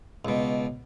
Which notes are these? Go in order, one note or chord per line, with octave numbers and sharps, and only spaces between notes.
C#2 B2